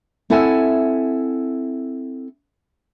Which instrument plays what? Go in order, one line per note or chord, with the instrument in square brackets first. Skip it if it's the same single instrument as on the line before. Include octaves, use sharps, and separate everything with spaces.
[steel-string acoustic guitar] C4 E4 A4 E5 F#5 G#5